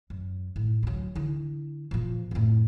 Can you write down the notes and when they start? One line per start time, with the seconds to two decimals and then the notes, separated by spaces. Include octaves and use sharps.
0.10 F#2
0.56 A2
0.83 D2 F#3
1.15 D3 E4
1.91 A#2 F3
2.31 F2 A2